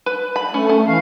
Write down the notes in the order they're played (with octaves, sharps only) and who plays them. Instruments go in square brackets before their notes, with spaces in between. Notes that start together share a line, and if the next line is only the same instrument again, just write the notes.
[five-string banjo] B4
B5
[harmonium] A3 [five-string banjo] C#4
[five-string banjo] C#4
[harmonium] E3 F5